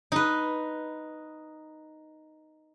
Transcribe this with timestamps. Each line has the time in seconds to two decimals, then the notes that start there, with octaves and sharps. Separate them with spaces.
0.12 D#4 B4